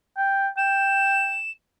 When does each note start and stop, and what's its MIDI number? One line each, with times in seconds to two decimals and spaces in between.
0.17 0.48 79
0.57 1.38 79
0.57 1.50 100